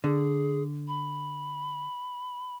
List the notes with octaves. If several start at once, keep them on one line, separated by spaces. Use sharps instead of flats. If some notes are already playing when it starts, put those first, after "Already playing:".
D3 G#4
B5